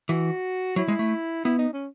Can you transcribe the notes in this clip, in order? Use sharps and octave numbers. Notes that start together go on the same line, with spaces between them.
E3 F#4
F#3 E4
G#3
A3
B3 E4
D#4
C#4